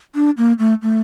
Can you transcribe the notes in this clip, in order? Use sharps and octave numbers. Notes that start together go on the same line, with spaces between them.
D4
A#3
A3
A3